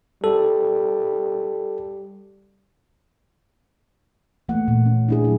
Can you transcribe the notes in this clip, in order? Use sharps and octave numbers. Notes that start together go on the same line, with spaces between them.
G3 A4
E3 A3 A#3 F#5
A#2
C#4
D4 E4 G#4
F#3 E4